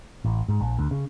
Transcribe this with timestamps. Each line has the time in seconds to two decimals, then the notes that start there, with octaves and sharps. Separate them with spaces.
0.25 A1
0.49 G#2
0.61 A#1
0.79 D2
0.91 C#3